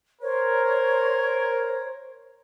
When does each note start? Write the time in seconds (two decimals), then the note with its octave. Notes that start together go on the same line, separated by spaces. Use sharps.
0.22 A#4 C5 C#5